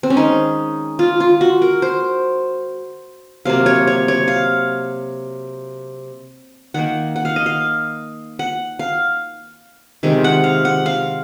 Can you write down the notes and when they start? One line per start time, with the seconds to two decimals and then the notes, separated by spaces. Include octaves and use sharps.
0.03 C4
0.10 C#4
0.17 D#3 G#3 D#4
0.99 F4
1.20 F4
1.41 F#4
1.62 A#4
1.82 C5
3.45 C3 F#3 A#3 F5
3.66 C#5
3.87 C#5
4.08 C#5
4.28 F5
6.74 D#3 A#3 F#5
7.16 F#5
7.25 F5
7.36 D#5
7.46 F5
8.39 F#5
8.79 F5
10.03 C3 D#3 G#3
10.24 F#5
10.44 F5
10.65 F#5
10.86 F5